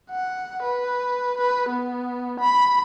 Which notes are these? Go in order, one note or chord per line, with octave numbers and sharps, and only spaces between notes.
F#5
B4
B4
B3
B5